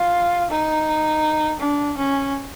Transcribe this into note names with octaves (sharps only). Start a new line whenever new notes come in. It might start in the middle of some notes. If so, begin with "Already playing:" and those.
Already playing: F4
D#4
D4
C#4